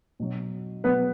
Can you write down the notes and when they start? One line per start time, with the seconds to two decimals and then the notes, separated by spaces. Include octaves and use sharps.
0.20 B2 F#3
0.84 B2 F#3 B3 B4